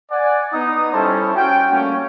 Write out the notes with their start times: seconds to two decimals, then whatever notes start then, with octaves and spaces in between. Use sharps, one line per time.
0.11 D5 F#5 G#5
0.53 B3 D#4 D#6
0.93 G3 C#4 E4 A4 C5 A5
1.35 C#4 F#4 G5
1.72 G3 A3 A#3 C#4